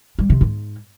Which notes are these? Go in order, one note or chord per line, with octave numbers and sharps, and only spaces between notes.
G3
C3
G#2